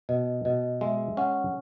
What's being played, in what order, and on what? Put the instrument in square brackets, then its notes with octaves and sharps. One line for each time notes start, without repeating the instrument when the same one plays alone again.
[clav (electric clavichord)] B2 [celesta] D#5
[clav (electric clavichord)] B2 [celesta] D#5
[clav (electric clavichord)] G#3 [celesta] E5
[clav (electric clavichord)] C#4 [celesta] F#5